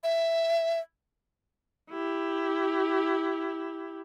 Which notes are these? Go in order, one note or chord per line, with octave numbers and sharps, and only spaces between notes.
E5
E4 G4